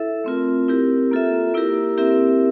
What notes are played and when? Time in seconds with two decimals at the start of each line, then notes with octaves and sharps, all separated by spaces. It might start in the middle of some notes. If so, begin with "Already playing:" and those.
Already playing: E4 A4 E5
0.24 A3 C4 F4 A#4
0.68 C4 E4 G4 A#4
1.11 A#3 F4 A4 E5
1.54 A#3 E4 G4 A#4
1.97 C4 E4 G4 A#4 E5